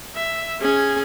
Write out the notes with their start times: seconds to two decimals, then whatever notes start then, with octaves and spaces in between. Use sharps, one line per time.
0.16 E5
0.61 C#4 G#4